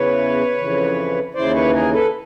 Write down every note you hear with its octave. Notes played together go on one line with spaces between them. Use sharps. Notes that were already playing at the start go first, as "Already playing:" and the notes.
Already playing: E2 C#3 E3 B4 C#5
F2 C#3 E3
D#2 C#3 E3 C5 D5
B4 C#5
G#4 A#4
A4 B4